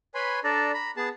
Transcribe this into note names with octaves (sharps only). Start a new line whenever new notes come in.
B4 C#5 G#5 B5 C6
D4 A4 D5 A#5
A#5 B5
B3 G#4 A5